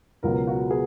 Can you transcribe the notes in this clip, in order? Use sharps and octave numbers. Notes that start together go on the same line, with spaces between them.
C#2 B2 F#3 B3 A#4
F#4
B3 G#4